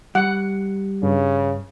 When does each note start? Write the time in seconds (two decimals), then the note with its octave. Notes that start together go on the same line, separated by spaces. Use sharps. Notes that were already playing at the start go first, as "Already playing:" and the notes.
0.15 G3 F#5
1.03 G2 C#3